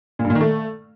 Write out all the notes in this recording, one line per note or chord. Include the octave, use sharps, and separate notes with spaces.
A#2
G2
A#2
D#3
A3